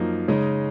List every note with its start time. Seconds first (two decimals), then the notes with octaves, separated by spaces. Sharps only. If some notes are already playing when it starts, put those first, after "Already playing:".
Already playing: F#2 F3 A#3 D#4
0.28 C#3 G#3 D#4